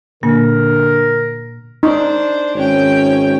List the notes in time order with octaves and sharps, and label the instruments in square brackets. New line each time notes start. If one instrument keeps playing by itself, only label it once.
[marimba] A#2 A#3 [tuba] D3 [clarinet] A#4
[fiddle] D4 C5 [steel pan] D#4
[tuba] G#1 [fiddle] C#4 G5